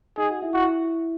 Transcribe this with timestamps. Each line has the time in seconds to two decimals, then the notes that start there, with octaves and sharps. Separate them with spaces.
0.17 D#4 G#4 D#5
0.29 F#4 F#5
0.42 E4 E5
0.54 E4 F#4 E5